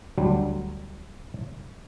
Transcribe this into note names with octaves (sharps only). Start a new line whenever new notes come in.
D2 F#3 G3